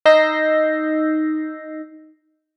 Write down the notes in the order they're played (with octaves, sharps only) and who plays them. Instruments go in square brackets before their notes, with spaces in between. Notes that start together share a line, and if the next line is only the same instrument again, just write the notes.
[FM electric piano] D#4 D#5 E6 G6 A#6 C7